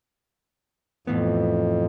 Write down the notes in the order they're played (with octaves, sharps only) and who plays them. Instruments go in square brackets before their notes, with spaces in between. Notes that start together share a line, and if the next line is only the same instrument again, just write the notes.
[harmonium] F2 [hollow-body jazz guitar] A2 E3 B3